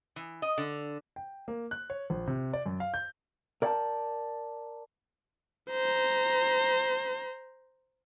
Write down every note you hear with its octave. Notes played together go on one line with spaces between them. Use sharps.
E3
D#5
D3
G5
A#3
F#6
C#5
A#1
C3
D5
F#2
F5
G6
A#4 D5 E5 F#5 G5 A5
C5 A#5